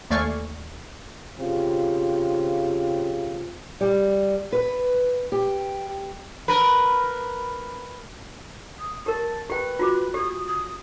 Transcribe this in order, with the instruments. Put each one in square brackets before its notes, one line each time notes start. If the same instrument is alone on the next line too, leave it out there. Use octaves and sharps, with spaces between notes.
[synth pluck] D#2 A3 D5 F5 G#5 C#6
[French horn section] C#3 C4 F4 G4
[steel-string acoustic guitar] G3
B4
G4
[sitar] A#4 B4
[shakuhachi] D#6
[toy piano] G4 A#4 [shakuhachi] A5
[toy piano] G4 G5 [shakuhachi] B4
[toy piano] F4 F#4 D6
[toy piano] G4 [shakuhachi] D#6
[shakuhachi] D#6